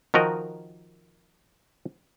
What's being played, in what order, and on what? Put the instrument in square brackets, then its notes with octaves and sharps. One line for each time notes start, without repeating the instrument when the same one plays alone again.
[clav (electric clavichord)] D#3 F3 F#4 A#4 D#5